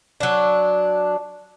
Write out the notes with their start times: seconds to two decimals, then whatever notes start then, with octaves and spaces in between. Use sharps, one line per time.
0.20 F#3 D4